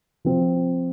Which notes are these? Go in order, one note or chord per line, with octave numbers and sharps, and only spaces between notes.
F3 C4 F4